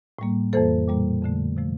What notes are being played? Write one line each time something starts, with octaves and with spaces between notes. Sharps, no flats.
A2 G3 A#3
F2 E3 A#3 A4 C5
A#2 G3 A#3
F2 D3 A3
C3 F3 A3